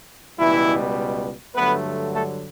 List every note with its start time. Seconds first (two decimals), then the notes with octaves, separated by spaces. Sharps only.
0.38 C#2 B2 E3 G3 E4
1.56 G2 D3 F#3 A3 B3 B4
2.14 A3 A4